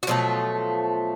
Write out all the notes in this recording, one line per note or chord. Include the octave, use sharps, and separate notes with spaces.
F#4
B2 F3 F#3 A3 F4